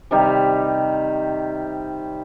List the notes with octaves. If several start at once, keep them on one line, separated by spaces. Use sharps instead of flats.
C3 D#3 G3